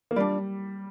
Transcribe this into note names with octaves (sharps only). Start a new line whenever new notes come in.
A#3
G3 D4 F4 D5